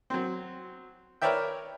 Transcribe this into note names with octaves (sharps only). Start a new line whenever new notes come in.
F#3 C4
A#4 B4 C#5 D5 E5 G5